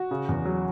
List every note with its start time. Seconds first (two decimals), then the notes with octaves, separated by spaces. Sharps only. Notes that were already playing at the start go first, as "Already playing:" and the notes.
Already playing: F#4
0.11 C#3
0.29 E2
0.45 F#3